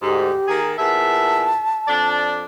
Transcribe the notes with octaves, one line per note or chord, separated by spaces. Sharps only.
D2 G#2 G4
D#3 A#3 G#4
E2 A#2 E5 A5
F2 D4 D5